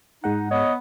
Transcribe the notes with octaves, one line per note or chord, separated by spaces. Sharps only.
G#2 G#3 D#4 F#5
B3 C#5 D#5